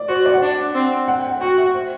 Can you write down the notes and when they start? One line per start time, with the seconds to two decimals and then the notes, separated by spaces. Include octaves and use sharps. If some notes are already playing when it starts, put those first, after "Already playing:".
Already playing: D5
0.08 F#4 C5
0.26 D5
0.34 F#5
0.42 D4
0.75 C4
1.08 F#5
1.19 G5
1.30 F#5
1.41 F#4 G5
1.58 E5
1.74 C5